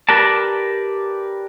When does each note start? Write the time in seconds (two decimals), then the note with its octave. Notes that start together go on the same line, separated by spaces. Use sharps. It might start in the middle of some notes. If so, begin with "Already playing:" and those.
0.09 G4 A#4 B4 D5 A5